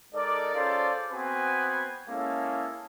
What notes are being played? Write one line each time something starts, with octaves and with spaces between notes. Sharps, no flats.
G#3 D#4 A4 A#4 D5
C#4 F4 G#4 A4 C5 D5
B3 C4 F#4 B4 G#5
G#3 A#3 C#4 E4 A4